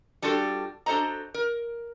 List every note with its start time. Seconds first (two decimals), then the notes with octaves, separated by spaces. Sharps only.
0.22 G3 D4 F4 F#4 A4
0.86 D4 F#4 A4 C5 D#5 A#5
1.34 A#4